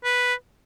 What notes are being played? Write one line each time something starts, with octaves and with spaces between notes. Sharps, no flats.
B4